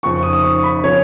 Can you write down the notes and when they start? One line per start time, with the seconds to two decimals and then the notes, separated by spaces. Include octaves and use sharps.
0.03 F2 C#3 F3 C#6
0.23 D#6
0.33 D#6
0.43 C#6
0.63 B5
0.83 C#3 F3 C#5